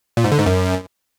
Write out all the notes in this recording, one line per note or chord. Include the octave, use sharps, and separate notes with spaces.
A#2
G#2
D3
G#2
F#2